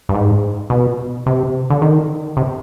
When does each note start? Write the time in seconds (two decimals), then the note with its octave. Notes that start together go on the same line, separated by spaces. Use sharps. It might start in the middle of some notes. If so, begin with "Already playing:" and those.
0.09 G2
0.14 G#2
0.70 B2
1.26 C3
1.70 D3
1.82 D#3
2.37 C3